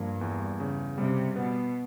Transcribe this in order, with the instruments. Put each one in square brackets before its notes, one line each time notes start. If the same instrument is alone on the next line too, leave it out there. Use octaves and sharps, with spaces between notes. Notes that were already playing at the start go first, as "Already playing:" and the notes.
Already playing: [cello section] G2 [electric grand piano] F3 A#3
[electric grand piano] E2
C#3
[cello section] C3 [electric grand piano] G3
[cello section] B2 [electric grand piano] B3